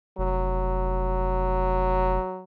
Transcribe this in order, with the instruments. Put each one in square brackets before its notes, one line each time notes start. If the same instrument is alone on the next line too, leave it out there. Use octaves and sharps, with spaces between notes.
[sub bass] F1 [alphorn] F#3